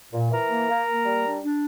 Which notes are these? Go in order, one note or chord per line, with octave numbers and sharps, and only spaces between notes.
A#2
E3 A#4 A#5
A#3
A#3
A#3
G3
D4
D4